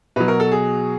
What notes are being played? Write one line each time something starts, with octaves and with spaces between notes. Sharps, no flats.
B2 F#3 B4
A#4
A4
G#4